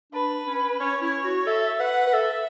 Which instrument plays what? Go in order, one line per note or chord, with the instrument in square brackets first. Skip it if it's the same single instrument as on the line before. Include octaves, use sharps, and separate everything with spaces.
[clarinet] D4 [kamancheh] B4
[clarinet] C#4
[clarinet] C#4 [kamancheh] C#5
[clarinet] E4
F#4
[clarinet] A4 [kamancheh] E5
[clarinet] B4 [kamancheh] F#5
[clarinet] B4
[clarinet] A4 [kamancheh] E5